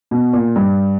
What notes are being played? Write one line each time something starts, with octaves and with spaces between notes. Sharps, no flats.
B2
A#2
G2